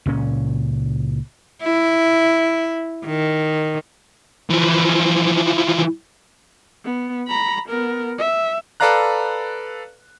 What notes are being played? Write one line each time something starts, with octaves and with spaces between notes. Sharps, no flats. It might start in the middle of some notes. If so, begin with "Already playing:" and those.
C#2 A#2 C#4
E4
D#3
E3 F3
B3
A#5 B5
B3 A#4
E5
A4 B4 D5 F5 A#5 F#6